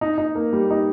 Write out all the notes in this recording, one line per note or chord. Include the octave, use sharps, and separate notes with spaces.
D#4
D#4
A#3
G3
D#4